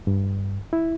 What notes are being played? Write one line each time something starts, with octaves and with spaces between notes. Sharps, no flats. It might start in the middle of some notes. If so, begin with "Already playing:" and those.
G2
E4